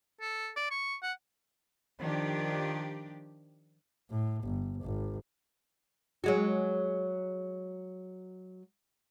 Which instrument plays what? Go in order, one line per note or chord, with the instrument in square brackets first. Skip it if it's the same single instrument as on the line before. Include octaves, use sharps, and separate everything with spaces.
[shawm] A4
D5
C#6
F#5
[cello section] D#3 F3 D4 G4
[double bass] A2
G1
G#1
[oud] F#3 G#3 F#4